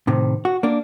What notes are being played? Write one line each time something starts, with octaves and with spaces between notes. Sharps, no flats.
A2 C3 D#3
F#4
A#3 D4